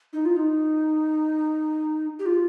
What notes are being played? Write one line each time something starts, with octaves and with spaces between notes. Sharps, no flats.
D#4
F4
D#4
G4
F4